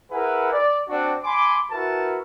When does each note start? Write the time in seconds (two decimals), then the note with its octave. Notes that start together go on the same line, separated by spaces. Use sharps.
0.11 E4 G#4 A#4 B4 F#5
0.52 D5
0.89 C4 D4 F#4
1.24 G#5 B5 C6 D6
1.71 E4 F#4 A#4 B4 A5